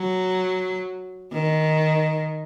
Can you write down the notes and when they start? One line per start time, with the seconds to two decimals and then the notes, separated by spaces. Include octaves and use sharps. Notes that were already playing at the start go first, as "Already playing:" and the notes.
Already playing: F#3
1.32 D#3